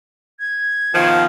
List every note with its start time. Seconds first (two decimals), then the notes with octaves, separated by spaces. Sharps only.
0.40 G#6
0.94 B2 D#3 F3